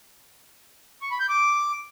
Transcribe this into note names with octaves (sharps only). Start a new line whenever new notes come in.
C#6
B5
G6
D6